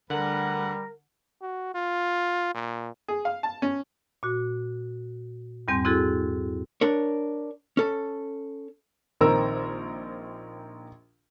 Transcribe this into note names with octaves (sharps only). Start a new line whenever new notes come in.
D2 D3 G3 A#4 B4 F#5
F#4
F4
A#2
G#4
F5
A5
C#4
A#2 F#4
E2 G#2 G3 C4 G6
C4 E4 F#4 G#4 A4
D4 A#4 C#5
C#4 A4
A#1 D#3 C4 A#4 A#5 E6